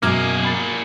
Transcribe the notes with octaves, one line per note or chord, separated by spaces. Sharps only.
F#2 B2 A#3 G#4 A#5 D6 F6 G#6
B5 A6